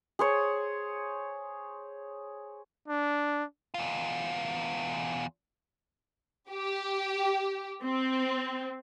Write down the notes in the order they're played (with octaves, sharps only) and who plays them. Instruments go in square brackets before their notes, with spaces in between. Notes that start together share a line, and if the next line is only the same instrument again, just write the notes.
[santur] G#4 C5 C#5
[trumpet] D4
[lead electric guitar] E2 F4
[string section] G4
C4